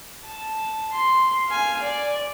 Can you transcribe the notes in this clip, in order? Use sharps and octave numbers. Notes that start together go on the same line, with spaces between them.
A5
C6
F5 G#5
D5